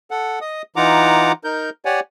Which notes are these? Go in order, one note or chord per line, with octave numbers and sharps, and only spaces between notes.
A4 F#5
D#5 D#6
E3 D#4 F4 F#5 A#5 D6
D#4 A#4 G6
G4 C#5 D5 F#5 G#5